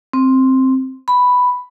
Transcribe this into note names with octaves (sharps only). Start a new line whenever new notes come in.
C4
B5